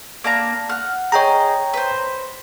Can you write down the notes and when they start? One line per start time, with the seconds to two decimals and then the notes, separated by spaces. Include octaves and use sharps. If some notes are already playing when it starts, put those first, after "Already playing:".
0.24 A#3 D4 A#5
0.69 F#5 F6
1.12 G#4 C#5 D#5 G5 A#5
1.73 B4 C5